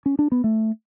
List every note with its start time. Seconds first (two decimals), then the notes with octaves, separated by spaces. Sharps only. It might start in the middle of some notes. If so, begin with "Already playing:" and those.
0.06 C#4
0.19 D4
0.32 B3
0.44 A3